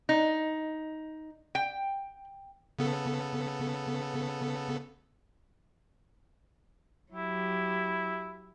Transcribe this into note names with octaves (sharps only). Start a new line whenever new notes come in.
D#4
G5
C#3 B3 A4
F#3 E4 G4